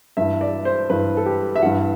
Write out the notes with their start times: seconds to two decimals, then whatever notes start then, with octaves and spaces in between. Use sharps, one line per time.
0.17 G2 E3 E5
0.41 D5
0.65 C5
0.90 G2 E3 B4
1.17 A4
1.26 G4
1.56 E5
1.62 G2 E3 F#5